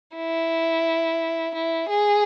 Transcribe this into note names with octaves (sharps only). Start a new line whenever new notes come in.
E4
E4
G#4